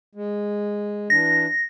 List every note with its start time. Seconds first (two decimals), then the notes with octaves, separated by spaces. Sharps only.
0.15 G#3
1.10 E3 D4 A#6